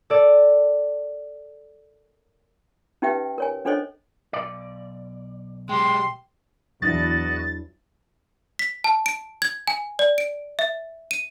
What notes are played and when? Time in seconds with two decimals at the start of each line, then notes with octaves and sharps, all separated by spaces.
0.10 A4 D5
3.02 C#4 D#4 G4 B4 E5 G5
3.38 A#4 C#5 G#5
3.65 C#4 D4 A4 C5 C#5 D#5
4.33 B1 D5
5.69 G#3 G4 G5 C6
6.82 E2 F#3 D4 E4 F#4 D#5 F#6 A6
8.59 B6
8.84 A5
9.06 D7
9.42 G#6
9.67 G#5
9.99 D5
10.18 D7
10.59 E5
11.11 D#7